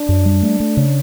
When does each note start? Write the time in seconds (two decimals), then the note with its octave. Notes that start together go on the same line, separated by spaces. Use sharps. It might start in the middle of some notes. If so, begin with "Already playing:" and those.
Already playing: D4
0.09 F#2
0.25 G3
0.43 A3
0.60 A3
0.77 C#3